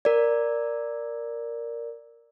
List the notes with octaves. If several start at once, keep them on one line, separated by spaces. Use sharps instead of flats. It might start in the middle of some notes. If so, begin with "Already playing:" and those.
A#4 D5